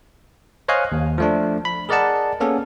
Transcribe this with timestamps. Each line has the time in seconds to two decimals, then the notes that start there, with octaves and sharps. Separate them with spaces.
0.68 C5 C#5 D#5 F5 G#5 F#6
0.92 D#2
1.18 F3 A3 D4
1.65 B5
1.89 G#4 A#4 D5 D#5 F#5 A5
2.40 A#3 B3 C#4 G#4 A4